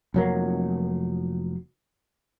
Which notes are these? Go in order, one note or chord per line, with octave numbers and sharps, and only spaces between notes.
F1 F#3 A#3